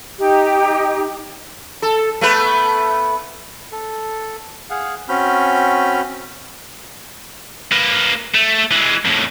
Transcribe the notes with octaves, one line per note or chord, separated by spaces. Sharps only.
D#4 G4
A4
A3 B3 B4
A4
G#4 F5 F#5
C4 C#4 F#4 B5 F6 G6
A#3 B4
A3
E3 G#3
F2 A2